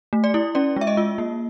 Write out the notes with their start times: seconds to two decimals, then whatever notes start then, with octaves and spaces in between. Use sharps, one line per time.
0.13 A3
0.24 D5
0.34 E4
0.55 C#4 D5
0.76 G#3 E5
0.87 D#5
0.97 F4
1.18 A#3